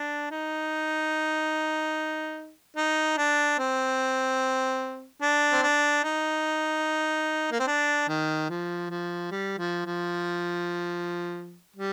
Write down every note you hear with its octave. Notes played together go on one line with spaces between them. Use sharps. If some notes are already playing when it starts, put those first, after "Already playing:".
Already playing: D4
D#4
D#4
D4
C4
D4
C4
D4
D#4
A#3
C4
D4
D#3
F3
F3
G3
F3
F3
G3